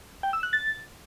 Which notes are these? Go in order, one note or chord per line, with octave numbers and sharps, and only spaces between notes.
G5
E6
F#6
A6